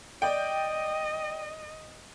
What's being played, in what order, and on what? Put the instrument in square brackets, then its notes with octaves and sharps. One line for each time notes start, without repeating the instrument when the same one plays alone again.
[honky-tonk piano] D5 G5 [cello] D#5